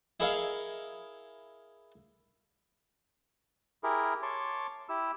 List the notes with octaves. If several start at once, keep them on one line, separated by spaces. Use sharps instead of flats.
E4 G#4 A#4 C#5 D#5 F5
E4 G4 G#4 A#4
C#5 A5 C6 D6
E4 G4 E6